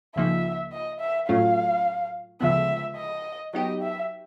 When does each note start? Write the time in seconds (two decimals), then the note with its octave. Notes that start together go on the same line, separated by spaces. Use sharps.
0.16 C#2 C#3 F3 A#3 D#4 E5
0.73 D#5
1.00 E5
1.28 A2 F#3 A3 C#4 F4 F5
2.41 D2 C#3 F3 G#3 B3 E5
2.97 D#5
3.53 F#3 B3 D#4 G4 D#5
3.82 E5